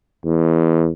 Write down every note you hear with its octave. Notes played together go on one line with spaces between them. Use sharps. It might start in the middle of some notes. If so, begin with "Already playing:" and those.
E2